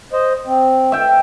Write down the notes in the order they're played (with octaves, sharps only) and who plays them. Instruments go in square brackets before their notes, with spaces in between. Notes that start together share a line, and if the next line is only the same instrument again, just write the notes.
[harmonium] C5 D#5
C4
[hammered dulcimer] E5 G5